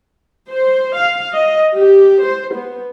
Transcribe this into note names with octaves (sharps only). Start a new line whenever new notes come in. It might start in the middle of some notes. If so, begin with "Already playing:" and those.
C5
F5
D#5
G4
C5
B3